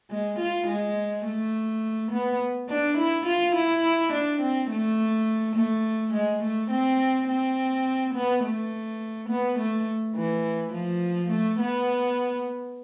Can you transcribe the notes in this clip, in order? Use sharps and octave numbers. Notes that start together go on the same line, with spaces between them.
G#3
F4
G#3
A3
B3
D4
E4
F4
E4
D4
C4
A3
A3
G#3
A3
C4
C4
B3
A3
B3
A3
E3
F3
A3
B3